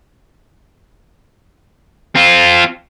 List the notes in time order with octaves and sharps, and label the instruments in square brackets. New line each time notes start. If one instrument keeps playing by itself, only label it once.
[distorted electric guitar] C4 F4